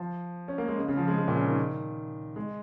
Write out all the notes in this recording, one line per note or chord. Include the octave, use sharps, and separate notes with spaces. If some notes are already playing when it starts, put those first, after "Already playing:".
Already playing: F3
C#4
A#3
G#3
C#3
C#3
F3
G#3
C#3
A#2
C#3
D#3
G#3